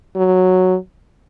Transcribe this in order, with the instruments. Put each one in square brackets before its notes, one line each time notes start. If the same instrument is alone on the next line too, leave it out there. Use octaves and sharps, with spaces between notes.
[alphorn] F#3